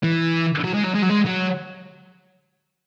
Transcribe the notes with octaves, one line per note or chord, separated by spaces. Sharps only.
E3
F#3
G#3
F#3
G#3
F#3
G#3
F#3